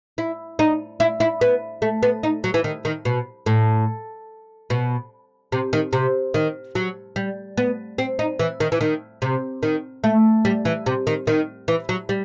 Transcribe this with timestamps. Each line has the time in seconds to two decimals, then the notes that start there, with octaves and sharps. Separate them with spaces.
0.18 E4
0.59 D#4
1.00 E4
1.20 E4
1.41 B3
1.82 A3
2.03 B3
2.23 D#4
2.44 F#3
2.54 E3
2.64 D#3
2.85 D#3
3.05 B2
3.46 A2
4.70 B2
5.52 C3
5.73 D#3
5.93 C3
6.34 D#3
6.75 F#3
7.16 G3
7.57 B3
7.98 C4
8.19 D#4
8.39 E3
8.60 D#3
8.72 E3
8.81 D#3
9.22 C3
9.63 D#3
10.04 A3
10.45 G3
10.65 E3
10.86 C3
11.07 D#3
11.27 D#3
11.68 E3
11.89 F#3
12.09 G3